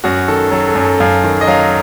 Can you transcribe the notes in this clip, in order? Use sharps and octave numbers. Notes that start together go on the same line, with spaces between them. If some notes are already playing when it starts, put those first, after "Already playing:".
F#2 F#4
D#3 A4
F#3 A4
A4
F#2
A4
F#2 F5
D#3
D#5
F#3 F5